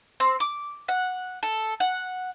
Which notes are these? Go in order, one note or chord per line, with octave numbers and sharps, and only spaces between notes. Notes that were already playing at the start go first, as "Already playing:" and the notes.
C4
D6
F#5
A4
F#5